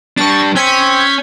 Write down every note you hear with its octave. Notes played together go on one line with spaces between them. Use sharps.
G3 D4 C#6 A6
C4 C#4 G6 G#6 B6